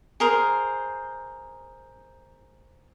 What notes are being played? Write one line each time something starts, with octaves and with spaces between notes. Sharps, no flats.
G#4 A#4 C5